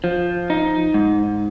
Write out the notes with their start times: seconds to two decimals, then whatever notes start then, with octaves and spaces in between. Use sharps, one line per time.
0.04 F3
0.50 D#4
0.94 G#2